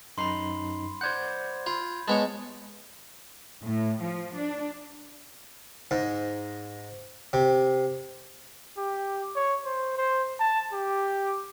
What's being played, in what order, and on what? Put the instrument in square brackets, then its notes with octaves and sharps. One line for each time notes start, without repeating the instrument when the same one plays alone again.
[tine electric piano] F#2 D#4 C7 [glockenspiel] B5 C6
[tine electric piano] C5 D5 F#5 [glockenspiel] G6 G#6
[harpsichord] F4 [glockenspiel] B5
[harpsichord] G#3 B3 C#5 [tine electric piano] A5
[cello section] A2
F3
D4
[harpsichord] G#2
C3
[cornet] G4
C#5
C5
C5
A5
G4